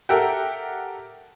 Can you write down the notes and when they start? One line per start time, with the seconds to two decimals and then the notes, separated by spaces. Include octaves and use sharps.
0.09 G4 A4 A#4 E5 F#5 G5